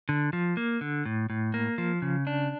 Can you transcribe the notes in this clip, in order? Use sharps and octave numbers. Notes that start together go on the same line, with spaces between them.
D3
F3
A#3
D3
A2
A2
A#3
F3
C#3
D4